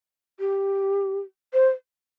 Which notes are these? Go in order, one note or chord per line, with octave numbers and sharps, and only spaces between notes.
G4
C5